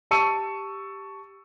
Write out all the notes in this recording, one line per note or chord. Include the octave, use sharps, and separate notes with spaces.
G4 A5 C#6 E6 C#7 D#7